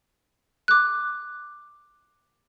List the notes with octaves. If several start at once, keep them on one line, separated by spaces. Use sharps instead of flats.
D6 F#6